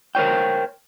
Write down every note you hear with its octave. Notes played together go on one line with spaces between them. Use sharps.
A#4 C5 C#5 G5